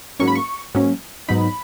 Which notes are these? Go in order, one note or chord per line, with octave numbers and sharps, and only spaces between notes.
G#2 F#3 A#3 C#4 C#6
B5
C#6
G#2 F#3 A#3 C#4
G#2 F#3 B3 D#4 B5